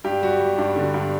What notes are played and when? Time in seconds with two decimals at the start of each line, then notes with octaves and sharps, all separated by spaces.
0.04 G2 G4
0.22 G3 F#4
0.39 G3
0.58 G2 D4
0.76 D3
0.94 G2